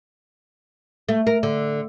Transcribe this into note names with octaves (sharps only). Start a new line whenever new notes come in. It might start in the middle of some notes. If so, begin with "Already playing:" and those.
A3
A#4
D3